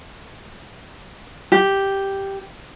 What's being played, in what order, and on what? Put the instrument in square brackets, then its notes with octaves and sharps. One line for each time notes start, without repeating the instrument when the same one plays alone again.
[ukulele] G4